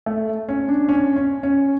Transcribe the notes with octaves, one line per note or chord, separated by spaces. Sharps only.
A3
C#4
D4
C#4
C#4
C#4